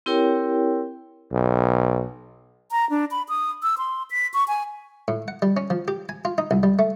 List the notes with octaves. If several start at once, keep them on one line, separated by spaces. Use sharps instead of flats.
C4 E4 G4 A#4 C#5 G5
B1
A#5
D4
B5
D#6
E6
C6
B6
C#6
G#5
A2
F#5
G3
C#4
F3
G4
G#5
F4
D#4
C2
G3
A3